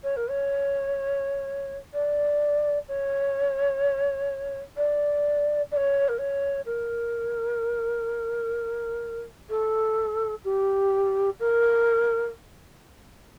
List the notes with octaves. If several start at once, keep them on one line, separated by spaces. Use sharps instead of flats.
C#5
A#4
C#5
D5
C#5
D5
D5
C#5
A#4
C#5
A#4
A4
G4
A#4